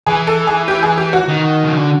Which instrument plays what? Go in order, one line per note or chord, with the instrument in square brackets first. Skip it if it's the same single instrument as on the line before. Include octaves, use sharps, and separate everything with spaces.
[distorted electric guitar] E3 [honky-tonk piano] G#4
[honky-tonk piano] A4
G#4
G4
G#4
G4
F#4
[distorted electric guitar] D#3
C#3
D3